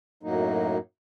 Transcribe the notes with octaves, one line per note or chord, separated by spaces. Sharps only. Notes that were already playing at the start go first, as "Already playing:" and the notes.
F#2 A2 F#3 A#3 D#4